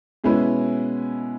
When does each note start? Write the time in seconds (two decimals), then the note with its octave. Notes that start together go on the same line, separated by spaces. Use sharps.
0.24 B2 G#3 C#4 E4 B4